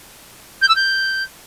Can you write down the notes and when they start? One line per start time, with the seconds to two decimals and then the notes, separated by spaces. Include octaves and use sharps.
0.61 G6
0.68 E6
0.75 G6